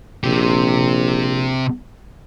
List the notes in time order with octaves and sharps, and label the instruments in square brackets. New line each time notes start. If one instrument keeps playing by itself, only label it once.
[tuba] A#1 [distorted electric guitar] C3 G4